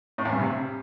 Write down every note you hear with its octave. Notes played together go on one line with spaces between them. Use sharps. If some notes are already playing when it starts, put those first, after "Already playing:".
A2
E2
G2
C3